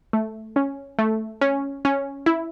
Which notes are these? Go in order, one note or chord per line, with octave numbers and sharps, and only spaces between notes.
A3
C#4
A3
C#4
C#4
E4